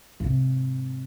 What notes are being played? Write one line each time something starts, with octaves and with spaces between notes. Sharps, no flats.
G#2 C3